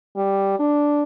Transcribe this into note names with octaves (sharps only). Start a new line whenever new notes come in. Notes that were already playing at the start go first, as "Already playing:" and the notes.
G3
D4